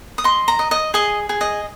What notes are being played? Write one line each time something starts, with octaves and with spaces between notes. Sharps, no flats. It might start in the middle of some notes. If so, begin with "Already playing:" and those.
D#6
D#5 C6
A#5
D#5
D#5
G#4 D#5
G#4
D#5